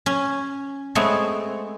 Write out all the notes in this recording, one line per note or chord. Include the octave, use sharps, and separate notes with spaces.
C#4
G#3 A3 B3 C4 C#5